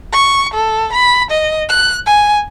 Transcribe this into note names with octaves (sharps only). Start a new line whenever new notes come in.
C#6
A4
B5
D#5
F#6
G#5